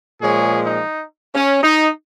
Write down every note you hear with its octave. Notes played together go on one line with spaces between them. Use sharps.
A#2 F3 G#3 G#4 C#5
D#4
C#4
D#4